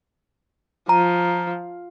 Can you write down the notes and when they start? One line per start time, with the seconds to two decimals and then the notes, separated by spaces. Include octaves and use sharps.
0.89 F3 A#5